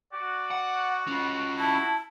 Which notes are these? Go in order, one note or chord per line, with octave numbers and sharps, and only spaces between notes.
F#4 D5
F#5
C#4 F4
E4 A5